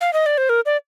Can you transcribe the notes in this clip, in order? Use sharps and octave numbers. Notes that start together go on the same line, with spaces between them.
F5
D#5
D5
C5
A#4
D5